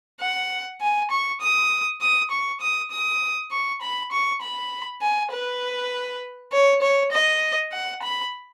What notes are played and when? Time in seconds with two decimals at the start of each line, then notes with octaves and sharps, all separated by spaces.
0.20 F#5
0.81 G#5
1.11 C#6
1.42 D#6
2.01 D#6
2.31 C#6
2.61 D#6
2.91 D#6
3.51 C#6
3.82 B5
4.12 C#6
4.42 B5
5.02 G#5
5.32 B4
6.52 C#5
6.82 C#5
7.12 D#5
7.73 F#5
8.02 B5